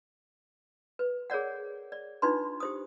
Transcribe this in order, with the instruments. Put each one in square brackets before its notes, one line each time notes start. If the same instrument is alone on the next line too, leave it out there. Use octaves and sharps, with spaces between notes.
[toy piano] B4
G#4 A#4 C#5 D5 F#5
D5
D4 D#4 F4 B4 C6
G4 C5 D#6